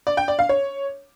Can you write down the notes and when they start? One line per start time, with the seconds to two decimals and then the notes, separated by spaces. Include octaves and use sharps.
0.07 D5
0.17 G5
0.28 D5
0.39 F5
0.49 C#5